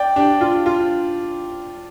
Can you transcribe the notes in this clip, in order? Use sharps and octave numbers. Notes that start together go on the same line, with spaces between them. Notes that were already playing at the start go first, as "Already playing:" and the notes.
Already playing: D5 G5
D4 G4
F4
F4